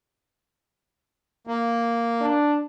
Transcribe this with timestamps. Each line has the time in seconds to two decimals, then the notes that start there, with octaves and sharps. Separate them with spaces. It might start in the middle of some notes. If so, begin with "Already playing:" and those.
1.47 A#3
2.21 D4